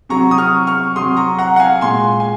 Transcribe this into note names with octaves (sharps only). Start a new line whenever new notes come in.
C3 F#3 A#5 C#6
D#6
C#6 F6
C#6 F6
C3 F#3 C6 D#6
A#5 C#6
F#5 A#5
F#5
F5 G#5
A#2 G#3 G#5 C6
G#5